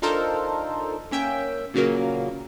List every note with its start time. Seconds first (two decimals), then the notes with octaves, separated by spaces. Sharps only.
0.02 D4 D#4 F4 A4 A#4 C5
1.11 A#3 C#4 E5 G5
1.74 A#2 C#3 F#3 A#3